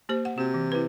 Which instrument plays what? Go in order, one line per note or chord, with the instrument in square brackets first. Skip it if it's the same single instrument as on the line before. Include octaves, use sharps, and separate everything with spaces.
[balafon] A#3 G4 C5
F#5
[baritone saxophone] C3 [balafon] F#4
[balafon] E3
E4 B4